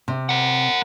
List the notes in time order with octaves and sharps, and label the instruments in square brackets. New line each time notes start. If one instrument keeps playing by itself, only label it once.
[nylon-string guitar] C3
[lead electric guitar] A#4 F#5